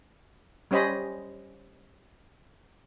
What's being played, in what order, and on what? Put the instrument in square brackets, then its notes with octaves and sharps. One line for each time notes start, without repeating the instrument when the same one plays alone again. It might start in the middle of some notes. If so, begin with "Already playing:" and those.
[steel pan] G3 C#4 C5 D#5 B5